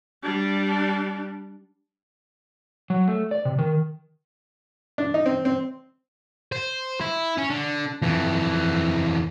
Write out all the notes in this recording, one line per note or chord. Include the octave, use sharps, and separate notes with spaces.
G3 D4
F#3
A3
D5
C3
D#3
D4
D#4
C4
C4
C5
E4
C#4
D3
F2 E3